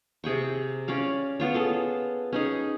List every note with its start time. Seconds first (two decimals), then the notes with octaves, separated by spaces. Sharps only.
0.24 C3 G#4 G5 C#6
0.88 C#4 C#5 D5 F5
1.40 B3 F4 C#5
1.54 G#4 A4 A5
2.33 C#4 D#4 G#4